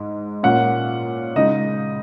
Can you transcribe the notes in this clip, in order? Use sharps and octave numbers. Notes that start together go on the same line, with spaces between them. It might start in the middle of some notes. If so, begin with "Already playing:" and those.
Already playing: G#2 G#3
A#2 A#3 C#4 F#5
C#3 G#3 D#4 D#5